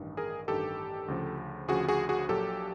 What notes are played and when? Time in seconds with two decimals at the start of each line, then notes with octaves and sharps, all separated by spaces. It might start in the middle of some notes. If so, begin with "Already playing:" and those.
Already playing: A1 G2 D#3
0.17 G#4 A#4
0.48 A1 G2 D#3 G4 A4
1.08 D2 C#3 F3
1.68 D2 C#3 F3 F#4 G#4
1.89 F#4 G#4
2.09 F#4 G#4
2.29 A#1 A#2 F#3 G4 A4